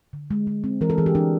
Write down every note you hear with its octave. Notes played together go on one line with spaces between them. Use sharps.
D3
G#3
G#3
C4
E3 A#4
A4
E3 G#4
G4
E3 D4